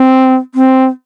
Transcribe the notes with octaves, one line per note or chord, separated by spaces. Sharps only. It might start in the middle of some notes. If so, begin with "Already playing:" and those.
Already playing: C4
C4